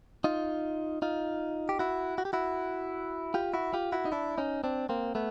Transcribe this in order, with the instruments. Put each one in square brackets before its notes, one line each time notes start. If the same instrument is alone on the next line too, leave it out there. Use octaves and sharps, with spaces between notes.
[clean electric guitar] D#4 F4
D#4 F4
G4
E4 F#4
F#4
G4
E4 F#4
F4 G4
E4 F#4
F4 G4
E4 F#4
D#4
D4 E4
C#4 D#4
C4 D4
A#3 C4
A3 B3